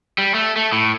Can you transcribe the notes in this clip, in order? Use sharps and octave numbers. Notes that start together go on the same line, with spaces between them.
G3
A3
A3
A2